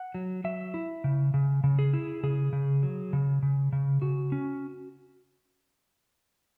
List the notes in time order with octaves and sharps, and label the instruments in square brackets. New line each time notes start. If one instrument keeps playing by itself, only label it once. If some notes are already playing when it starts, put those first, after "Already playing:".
Already playing: [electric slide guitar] F#5
F#3
F#3 E5
E4
C#3
C#3
C#3
G#4
E4
C#3 G#4
C#3
F#3
C#3
C#3
C#3
C#3 F#4
C#4